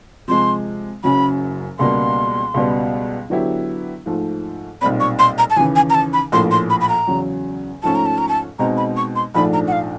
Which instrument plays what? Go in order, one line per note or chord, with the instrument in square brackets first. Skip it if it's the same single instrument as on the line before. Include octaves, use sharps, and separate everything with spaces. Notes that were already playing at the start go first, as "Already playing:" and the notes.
[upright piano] C3 F3 G#3 [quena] C6
[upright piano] F#1 F#2 C#3 F#3 [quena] B5
[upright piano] C#2 B2 G3 A#3 [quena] C6
[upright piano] C#2 B2 G3 B3
D3 F#3 B3 E4 G4
G#2 F3 A3
[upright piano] B1 A#2 G3 C4 [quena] B5
[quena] C#6
C6
A#5
A5
[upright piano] D#2 C#3 E3 [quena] G#5
[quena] G#5
A#5
A5
B5
[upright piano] A#1 A2 F3 A#3 [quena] C6
[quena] C6
B5
B5
A#5
[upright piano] E2 C#3 F#3
[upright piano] G#2 F3 A3 C#4 [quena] A5
[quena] A#5
A5
A#5
A5
[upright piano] B2 G#3 C4 D#4 [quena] A#5
[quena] B5
C#6
C6
[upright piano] A#1 G#2 F3 A3 D4 [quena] B5
[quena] A#5
F#5
F5